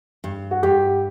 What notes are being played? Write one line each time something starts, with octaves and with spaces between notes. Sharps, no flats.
G2
F#4
G2 G4